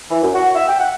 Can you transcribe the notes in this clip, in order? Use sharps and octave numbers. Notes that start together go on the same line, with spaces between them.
E3
F#2
F#4
E5
G5
F#5